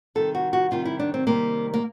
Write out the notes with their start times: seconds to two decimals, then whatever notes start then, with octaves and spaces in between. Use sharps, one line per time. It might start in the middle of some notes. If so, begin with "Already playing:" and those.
0.15 C3 D#3 G3 A4
0.35 F#4
0.53 F#4
0.71 C3 D#3 G3 F4
0.85 E4
0.99 D4
1.14 C4
1.27 C3 D#3 G3 A#3
1.74 A#3